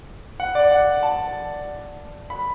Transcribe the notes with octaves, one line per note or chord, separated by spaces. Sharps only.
F#5
D5
F#5
A5
B5